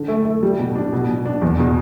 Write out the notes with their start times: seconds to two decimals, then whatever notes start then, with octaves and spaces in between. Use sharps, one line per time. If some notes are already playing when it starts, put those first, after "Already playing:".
Already playing: D3
0.08 A3
0.25 A3
0.43 G3
0.59 B2
0.75 D4
0.93 B2
1.09 B2
1.25 D4
1.42 E2
1.59 B2